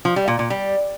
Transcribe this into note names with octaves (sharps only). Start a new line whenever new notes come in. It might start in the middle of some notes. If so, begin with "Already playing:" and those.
F3
G3
A#2
A#2
G3